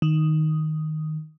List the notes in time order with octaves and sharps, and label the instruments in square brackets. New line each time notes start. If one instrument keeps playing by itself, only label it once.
[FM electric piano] D#3